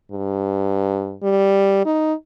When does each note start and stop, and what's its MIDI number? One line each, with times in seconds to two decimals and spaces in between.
0.11 1.17 43
1.23 1.82 55
1.85 2.14 63